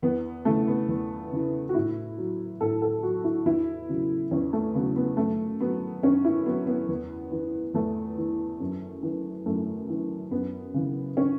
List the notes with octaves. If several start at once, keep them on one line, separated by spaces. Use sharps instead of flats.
E2 B3
C#3 E3 A3
B3
E2
C#3 E3
F#4
A2 E4
F#3
A2 A4
A4
F#3 F#4
E4
E2 E4
C#3 F#3
E2 C#4
A3
C#3 F#3 B3
B3
F#2 A3
F#3 B3
F#2 C#4
E4
F#3 B3
B3
E2
E3
E2 A3
E3
F#2
E3
F#2 A3
E3
F#2 B3
C#3 E3
C#4